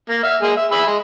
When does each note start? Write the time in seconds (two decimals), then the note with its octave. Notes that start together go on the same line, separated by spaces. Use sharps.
0.09 A#3
0.23 E5 F6
0.42 G#3 A#3 G#4
0.57 E5
0.72 G#4 E5 B5
0.87 G#3